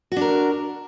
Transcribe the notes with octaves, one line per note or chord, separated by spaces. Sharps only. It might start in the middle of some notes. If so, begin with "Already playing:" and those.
D4 F#4 A#4